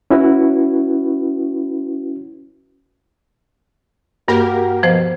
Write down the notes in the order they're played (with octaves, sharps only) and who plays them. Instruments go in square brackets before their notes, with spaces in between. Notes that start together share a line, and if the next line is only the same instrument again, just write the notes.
[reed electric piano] C#4 E4 F#4 B4
[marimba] G2 [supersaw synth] A#3 G4 A#4 [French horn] F#4
[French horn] B2 [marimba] F3 C5